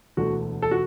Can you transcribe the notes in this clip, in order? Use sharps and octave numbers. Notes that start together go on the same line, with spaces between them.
E1 D2 D3 F#4
A4
F#4